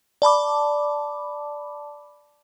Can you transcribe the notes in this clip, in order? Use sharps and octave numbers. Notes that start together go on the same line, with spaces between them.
D5 A5 B5 D6